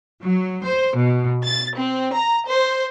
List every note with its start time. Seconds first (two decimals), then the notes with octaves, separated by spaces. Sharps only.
0.23 F#3
0.64 C5
0.95 B2
1.44 A6
1.78 C4
2.14 A#5
2.48 C5